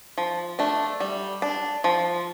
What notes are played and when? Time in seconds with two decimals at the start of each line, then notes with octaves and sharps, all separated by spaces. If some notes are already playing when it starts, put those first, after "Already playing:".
0.18 F3
0.59 A3 D4
1.00 G3
1.42 D4
1.84 F3